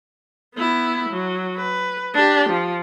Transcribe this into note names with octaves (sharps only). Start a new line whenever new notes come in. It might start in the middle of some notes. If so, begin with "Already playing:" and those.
B3 E4
F#3
B4
D4 G4
F3